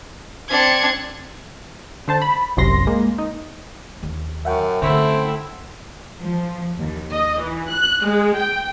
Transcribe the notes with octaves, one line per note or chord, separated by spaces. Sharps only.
C4 D4 G#6 C#7
D3 C5 A5
B5
G1 C2 F#2 C3 C6 A#6
G#3 A#3
D#4
D#2
F#2 E5 F#5 G5
D3 A3 C4 C#4 E4
F3
D#2
D#5
E3
F#6
G#3
G5